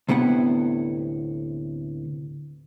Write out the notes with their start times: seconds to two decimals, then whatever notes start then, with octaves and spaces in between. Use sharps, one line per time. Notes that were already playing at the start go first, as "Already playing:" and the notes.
0.09 D2 A2 C3 B3 F#5